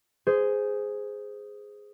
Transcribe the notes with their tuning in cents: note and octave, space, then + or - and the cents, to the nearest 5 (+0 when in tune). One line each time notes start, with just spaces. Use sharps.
G#4 +0 C5 -15